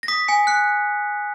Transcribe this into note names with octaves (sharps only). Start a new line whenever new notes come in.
A#6
D#6 B6
G#5 C#7
F#6 C#7